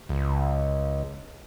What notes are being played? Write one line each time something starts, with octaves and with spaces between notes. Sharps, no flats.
C#2